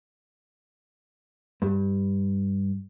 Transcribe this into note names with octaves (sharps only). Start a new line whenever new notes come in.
G2